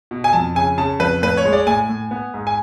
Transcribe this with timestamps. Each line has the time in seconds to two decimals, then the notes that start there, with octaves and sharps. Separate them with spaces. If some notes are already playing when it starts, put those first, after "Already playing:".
0.11 B2
0.24 G#5
0.33 F2 A5
0.55 C#3 G#5
0.78 C#3 A5
1.00 F2 B4
1.22 A2 B4
1.37 C#5
1.45 G#3
1.53 D5
1.67 A2 G#5
1.89 A2
2.11 B3
2.34 G#2
2.47 G#5